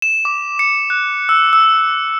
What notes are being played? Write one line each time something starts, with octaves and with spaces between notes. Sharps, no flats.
E7
D6
C#7
F#6
E6
E6